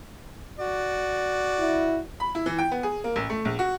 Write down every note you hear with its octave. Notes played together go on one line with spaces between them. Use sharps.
F#4 D5
E4
B5
E4
E3
G5
B3
G#4
A#3
A1
A3
A#1
F#4